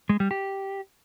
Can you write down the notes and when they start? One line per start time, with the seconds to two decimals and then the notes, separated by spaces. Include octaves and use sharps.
0.09 G#3
0.20 G3
0.31 G4